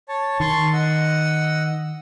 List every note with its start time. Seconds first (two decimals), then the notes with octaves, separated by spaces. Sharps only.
0.09 C#5 A5
0.40 D#3 A5 C6 C#6
0.73 D#5 F#5 E6